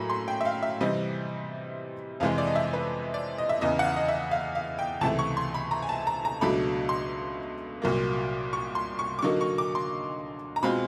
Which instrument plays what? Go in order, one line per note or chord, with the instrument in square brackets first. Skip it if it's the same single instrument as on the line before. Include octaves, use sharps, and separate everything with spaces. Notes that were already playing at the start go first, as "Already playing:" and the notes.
Already playing: [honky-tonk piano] A2 F#3 A#3 C#4 A#5 B5
C6
G5
E5
F5
E5
C3 E3 G3 C4 D#5
F2 C3 E3 G#3 F5
D5
D#5
E5
B4
D5
D#5
E5
E2 C#3 E3 D#5
F#5
F5
D#5
E5
F5
F5
G5
C#2 C3 E3 A3 A5
C#6
C6
B5
A#5
G#5
A5
A#5
A#5
C#2 B2 F#3 A3 D4 B5
C6
C2 A#2 F#3 A#3
C#6
C6
C#6
D6
D3 F#3 A#3 D#4 C#6
C#6
D6
C6
A#5
B2 G#3 C4 F4 B5